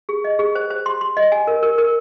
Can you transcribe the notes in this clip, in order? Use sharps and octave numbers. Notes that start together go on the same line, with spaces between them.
G#4
D#5
G#4
C5
C5
C6
C6
D#5
G#5
A#4
A#4
A#4